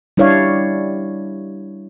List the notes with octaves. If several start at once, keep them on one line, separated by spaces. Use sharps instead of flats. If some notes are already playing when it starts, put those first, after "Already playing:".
G3 D4 E4 C#5 D5 F5